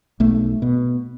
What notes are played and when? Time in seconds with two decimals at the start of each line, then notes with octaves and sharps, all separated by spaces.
0.20 B1 A3
0.62 B2